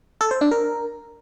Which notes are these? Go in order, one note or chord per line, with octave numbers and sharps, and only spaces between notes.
A4
C5
D4
A#4